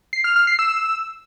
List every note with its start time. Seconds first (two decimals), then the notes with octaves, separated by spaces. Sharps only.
0.13 C7
0.24 F6
0.36 F6
0.47 C7
0.59 E6